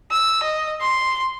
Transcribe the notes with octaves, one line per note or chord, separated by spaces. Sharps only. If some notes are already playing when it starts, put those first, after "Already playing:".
E6
D#5
C6